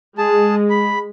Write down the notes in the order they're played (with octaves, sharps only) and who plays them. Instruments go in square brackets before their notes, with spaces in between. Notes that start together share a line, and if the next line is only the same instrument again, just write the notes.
[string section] G#3 [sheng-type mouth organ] G#4 A5
[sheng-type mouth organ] B5